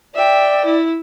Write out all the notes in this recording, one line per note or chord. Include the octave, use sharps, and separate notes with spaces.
D5 E5 G5
E4